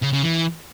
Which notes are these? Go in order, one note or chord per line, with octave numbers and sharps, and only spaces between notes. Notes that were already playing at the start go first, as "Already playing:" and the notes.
C#3
C#3
E3